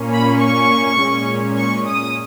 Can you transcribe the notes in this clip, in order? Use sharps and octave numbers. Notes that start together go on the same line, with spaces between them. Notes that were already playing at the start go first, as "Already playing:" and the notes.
Already playing: A#2 A#3 C#4
B5
C#6
A#2 G#3 C#4
C#6
D#6